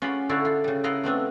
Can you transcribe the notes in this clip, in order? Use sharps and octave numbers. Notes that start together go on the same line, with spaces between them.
C#4 F4 F#4 G#4 D5 B5
D3 E4 F#4 C#5 D5 F5
F4
C#3 G3
E4 F4 A#4 D#5 F5 F#5
A3 B3 C4 D4